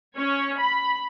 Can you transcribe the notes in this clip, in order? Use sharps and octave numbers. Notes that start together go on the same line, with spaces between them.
C#4 C#5
B5